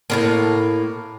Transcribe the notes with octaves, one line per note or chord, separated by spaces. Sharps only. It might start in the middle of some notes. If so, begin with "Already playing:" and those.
A2 C#3 A#3